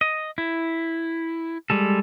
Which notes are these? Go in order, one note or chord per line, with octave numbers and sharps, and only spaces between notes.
D#5
E4
G3 G#3 A4